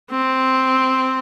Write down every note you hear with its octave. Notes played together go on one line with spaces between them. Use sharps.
C4